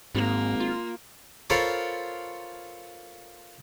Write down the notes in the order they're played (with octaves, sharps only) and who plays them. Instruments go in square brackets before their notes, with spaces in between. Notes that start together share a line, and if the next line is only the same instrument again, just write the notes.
[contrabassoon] G#1 [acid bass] G#2 [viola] A#3
[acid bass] F4
[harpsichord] F4 A4 A#4 C5 C#5 B5